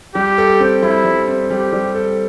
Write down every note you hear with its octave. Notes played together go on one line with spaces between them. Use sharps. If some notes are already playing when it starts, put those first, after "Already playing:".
G3 G4
A4
C4
G3 E4
G3
C4
G3 G4
G3
A4